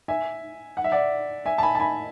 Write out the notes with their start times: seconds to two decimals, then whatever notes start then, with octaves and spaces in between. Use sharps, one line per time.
0.08 E5 G#5
0.77 F#5
0.84 E5
0.92 D5 F#5
1.45 E5 G#5
1.58 A5
1.63 G#5 B5
1.75 A5
1.80 G#5 B5